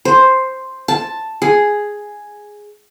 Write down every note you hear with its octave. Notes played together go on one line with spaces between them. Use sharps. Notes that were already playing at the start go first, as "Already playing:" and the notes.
C5
A5
G#4